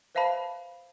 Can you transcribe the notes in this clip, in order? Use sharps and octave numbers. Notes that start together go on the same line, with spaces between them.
B4 C5 E5 F5 A5 B5